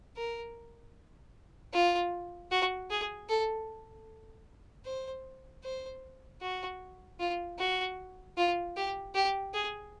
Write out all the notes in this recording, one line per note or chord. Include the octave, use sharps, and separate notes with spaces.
A#4
F4
F#4
G#4
A4
C5
C5
F#4
F4
F#4
F4
G4
G4
G#4